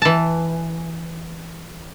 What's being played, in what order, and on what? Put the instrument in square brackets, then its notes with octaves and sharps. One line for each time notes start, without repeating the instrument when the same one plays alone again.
[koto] E3 A5